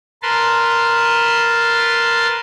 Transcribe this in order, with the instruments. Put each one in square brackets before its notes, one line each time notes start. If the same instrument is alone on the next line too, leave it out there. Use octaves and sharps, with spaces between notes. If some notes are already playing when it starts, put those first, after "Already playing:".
[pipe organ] A#4 B4 A5 C6